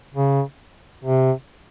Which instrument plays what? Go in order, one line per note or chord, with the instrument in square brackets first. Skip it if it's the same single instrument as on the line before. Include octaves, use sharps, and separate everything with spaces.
[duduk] C#3
C3